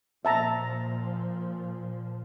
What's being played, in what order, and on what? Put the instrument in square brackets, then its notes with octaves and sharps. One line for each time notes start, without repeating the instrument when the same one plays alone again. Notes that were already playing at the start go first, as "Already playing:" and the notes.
[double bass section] A#2 F3 [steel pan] E5 A5 A#5